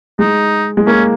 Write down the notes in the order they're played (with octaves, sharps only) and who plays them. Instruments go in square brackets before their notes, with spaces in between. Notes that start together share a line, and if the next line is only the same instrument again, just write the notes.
[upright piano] G#3 [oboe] D#4
[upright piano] G#3
[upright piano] A#3 [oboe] C#4